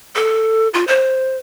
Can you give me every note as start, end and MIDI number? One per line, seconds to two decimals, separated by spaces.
0.15 0.68 69
0.74 0.86 65
0.87 1.37 72